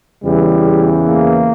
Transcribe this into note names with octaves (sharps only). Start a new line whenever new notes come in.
E2 C#3 E3 G3
A#3